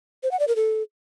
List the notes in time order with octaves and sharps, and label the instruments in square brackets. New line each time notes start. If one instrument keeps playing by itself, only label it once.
[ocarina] C5
F#5
D5
A#4
A4